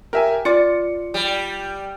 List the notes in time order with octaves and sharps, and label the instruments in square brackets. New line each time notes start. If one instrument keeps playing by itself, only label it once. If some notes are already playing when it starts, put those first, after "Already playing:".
[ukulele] G4 [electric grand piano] A#4 E5 G#5
[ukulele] F4 D5 [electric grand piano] C#7
[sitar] G3